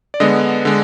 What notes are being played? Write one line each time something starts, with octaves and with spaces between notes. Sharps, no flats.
D5
D3 G#3 B3 D#5
D3 G#3